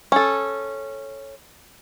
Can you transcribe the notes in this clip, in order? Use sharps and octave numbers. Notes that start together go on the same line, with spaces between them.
C#4 A4